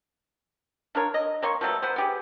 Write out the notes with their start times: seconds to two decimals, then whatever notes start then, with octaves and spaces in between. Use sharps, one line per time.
0.95 D4 F4 A#4 C#5
1.14 D#5
1.42 A#3 C#5 C6 C#6
1.61 F3 F#3 A3 B3
1.82 B3 B4 C5
1.96 B3 G4 G#4